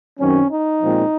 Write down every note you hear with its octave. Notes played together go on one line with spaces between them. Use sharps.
F#2 D#3 F#3 C4 C#4
D#4
A#2 F3 G#3 C4